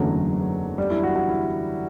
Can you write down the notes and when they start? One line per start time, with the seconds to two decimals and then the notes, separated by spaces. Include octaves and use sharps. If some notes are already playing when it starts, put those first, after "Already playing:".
Already playing: F#1 E2 D3 F#3 A3 C#4
0.78 G3
0.90 E4
1.03 F#4
1.16 F#4
1.29 E4